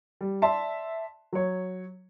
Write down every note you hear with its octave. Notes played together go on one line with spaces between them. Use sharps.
G3
D5 E5 A5 C6
F#3 C#5